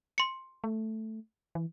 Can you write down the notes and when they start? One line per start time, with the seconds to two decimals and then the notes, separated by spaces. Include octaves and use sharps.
0.18 C6 C#7
0.64 A3
1.55 E3